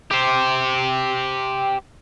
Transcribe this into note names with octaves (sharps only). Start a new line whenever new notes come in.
G4 C5